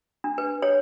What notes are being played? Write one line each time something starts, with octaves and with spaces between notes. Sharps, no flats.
D4
B4
C#5